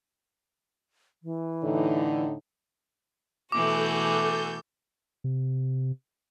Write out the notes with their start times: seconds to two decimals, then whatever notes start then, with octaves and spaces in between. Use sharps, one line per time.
1.23 E3
1.63 A2 D3 D#4
3.52 B2 E3 A3 F#4 G#4 A4 D6 G6
5.24 C3